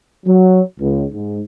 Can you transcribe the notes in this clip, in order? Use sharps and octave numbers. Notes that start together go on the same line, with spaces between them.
F#3
C#2
G#2